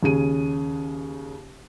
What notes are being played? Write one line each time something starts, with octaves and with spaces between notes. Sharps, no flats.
D#2 C#3 G#4 D#7